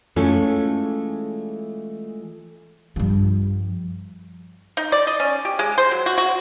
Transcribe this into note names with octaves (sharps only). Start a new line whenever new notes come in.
E3 G#3 A3 C#4 F4 A4
G2 F3
D#4
D5
D#5
C#4
G4
G#3
C5
F#3
F#4
F#4